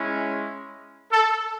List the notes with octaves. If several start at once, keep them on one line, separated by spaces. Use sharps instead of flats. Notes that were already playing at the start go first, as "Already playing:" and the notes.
Already playing: G#3 C#4 E4
A4